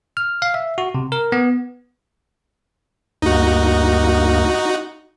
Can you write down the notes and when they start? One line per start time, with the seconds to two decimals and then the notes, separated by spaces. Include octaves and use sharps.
0.17 F6
0.42 F5
0.54 E5
0.78 F#4
0.95 C3
1.12 A#4
1.32 B3
3.22 D2 G2 A#3 D#4 F#4